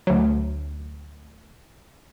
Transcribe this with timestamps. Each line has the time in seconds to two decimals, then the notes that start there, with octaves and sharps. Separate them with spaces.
0.07 D2 F#3